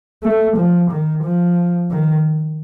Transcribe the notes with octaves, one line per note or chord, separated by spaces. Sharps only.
A3
F3
D#3
F3
D#3